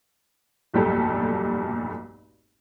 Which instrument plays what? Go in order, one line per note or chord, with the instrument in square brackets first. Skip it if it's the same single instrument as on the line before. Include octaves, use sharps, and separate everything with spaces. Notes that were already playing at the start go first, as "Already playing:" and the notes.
[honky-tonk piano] F1 B1 G2 A#2 G4 A4